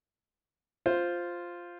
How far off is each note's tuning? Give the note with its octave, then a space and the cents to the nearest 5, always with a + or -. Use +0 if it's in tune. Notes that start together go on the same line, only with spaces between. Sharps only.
F4 +0 C5 +0